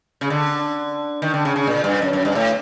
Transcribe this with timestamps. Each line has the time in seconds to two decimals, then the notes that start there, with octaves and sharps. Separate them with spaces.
0.21 C#3
0.30 D3
1.22 D#3
1.34 D3
1.45 C#3
1.56 C#3
1.67 A#2
1.84 G2
2.02 F#2
2.13 F#2
2.25 G2
2.35 A2